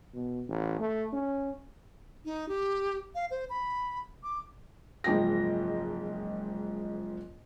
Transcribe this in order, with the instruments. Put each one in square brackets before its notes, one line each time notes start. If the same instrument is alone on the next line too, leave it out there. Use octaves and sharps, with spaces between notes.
[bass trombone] B2
A1
A3
C#4
[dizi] D#4
G4
F5
C5
B5
D6
[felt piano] F#1 G#2 F3 G5 A#6